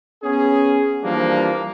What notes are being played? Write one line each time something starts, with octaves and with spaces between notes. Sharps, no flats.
B3 C#4 G#4
E3 F3 G3 A#3 D4